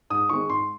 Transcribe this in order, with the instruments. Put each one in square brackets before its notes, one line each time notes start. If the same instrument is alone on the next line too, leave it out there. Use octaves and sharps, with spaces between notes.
[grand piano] G#2 D#6
D#3 G#3 C4 C#6
G#2 C6